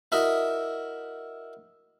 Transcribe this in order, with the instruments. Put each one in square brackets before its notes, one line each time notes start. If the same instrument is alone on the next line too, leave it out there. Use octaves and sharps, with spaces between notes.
[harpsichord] E4 F#4 A#4 D#5 E5